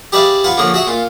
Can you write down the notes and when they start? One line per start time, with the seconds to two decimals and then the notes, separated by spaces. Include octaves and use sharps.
0.12 G4 G#4 B4 D5 E5 F5
0.44 F4 B4 F#5 G#5
0.57 D3 F3 A#3 G#4 C#5
0.74 F#4 G#4 E5 C#6
0.87 A#2 F4